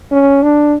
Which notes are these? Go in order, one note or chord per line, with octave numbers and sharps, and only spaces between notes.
C#4
D4